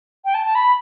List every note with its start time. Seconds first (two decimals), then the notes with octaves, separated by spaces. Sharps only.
0.25 G5
0.34 A5
0.45 A5
0.55 B5